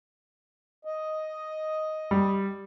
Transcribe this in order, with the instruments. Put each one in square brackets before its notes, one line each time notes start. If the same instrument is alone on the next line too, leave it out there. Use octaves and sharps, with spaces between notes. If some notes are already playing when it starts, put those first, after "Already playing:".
[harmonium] D#5
[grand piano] G3